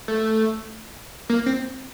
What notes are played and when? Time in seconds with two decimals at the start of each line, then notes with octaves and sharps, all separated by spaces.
0.08 A3
1.30 A#3
1.46 C4